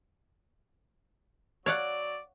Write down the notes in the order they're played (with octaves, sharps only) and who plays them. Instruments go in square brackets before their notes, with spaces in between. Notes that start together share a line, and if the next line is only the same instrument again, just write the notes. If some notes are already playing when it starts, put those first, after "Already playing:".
[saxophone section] F#3 D5 [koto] C#5 F5 F#5